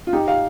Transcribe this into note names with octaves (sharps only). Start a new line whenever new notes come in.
F4
D#4 G4
F5